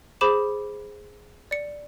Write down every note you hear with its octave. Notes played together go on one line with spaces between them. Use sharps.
G#4 C5 B5 D6 E7
D5 C#7